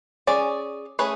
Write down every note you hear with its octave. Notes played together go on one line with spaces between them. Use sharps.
C#4 G#4 D5
A3 C#4 G#4 B4